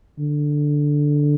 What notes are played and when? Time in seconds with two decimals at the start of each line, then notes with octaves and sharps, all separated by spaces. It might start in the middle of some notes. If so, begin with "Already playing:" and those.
0.19 D3